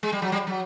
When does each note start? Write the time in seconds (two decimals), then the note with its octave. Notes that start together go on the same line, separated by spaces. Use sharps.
0.03 G#3
0.13 G3
0.22 F#3
0.32 G3
0.47 F#3